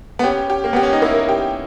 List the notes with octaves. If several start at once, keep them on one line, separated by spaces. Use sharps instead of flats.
B3
C#4 G4
G4
A#3
B3 G4
C#4
D#4
A#3 E4
G4